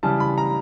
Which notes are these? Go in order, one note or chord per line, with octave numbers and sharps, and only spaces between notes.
C#3 E3 G3 A5
B5
A#5